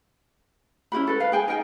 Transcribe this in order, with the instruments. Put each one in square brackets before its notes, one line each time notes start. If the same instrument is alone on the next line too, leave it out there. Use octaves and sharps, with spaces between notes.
[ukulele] C#4 E4 F#4 B5
A4 B4
B4 F5
G#4 G5 G#5
D#4 A#4 G5 G#5